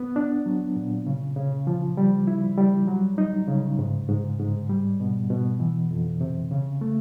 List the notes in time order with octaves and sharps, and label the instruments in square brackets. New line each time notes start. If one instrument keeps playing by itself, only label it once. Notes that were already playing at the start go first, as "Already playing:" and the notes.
Already playing: [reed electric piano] B3
D4
F#3
A#2
C#3
C#3
F3
G3
E4
G3
F#3
D#4
C#3
G#2
G#2
G#2
G3
B2
B2
E3
F2
C3
C#3
A3